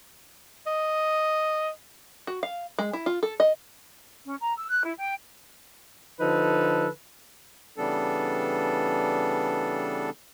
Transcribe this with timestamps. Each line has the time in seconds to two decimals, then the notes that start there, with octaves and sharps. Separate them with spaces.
0.67 D#5
2.27 F#4
2.43 F5
2.79 G#3
2.93 E4
3.06 F4
3.23 A4
3.40 D#5
4.25 C#4
4.39 A#5
4.57 E6
4.69 F#6
4.84 E4
4.97 G5
6.21 D3 F3 D#4 A4 B4
7.76 C#3 E3 G3 B3 D4 A4